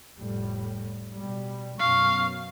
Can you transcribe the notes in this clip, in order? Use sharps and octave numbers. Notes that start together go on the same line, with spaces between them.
F1 A2 G3
B2 G3
F#2 B2 F5 C#6